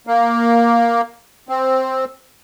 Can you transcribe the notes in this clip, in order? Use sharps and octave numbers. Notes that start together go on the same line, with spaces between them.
A#3
C4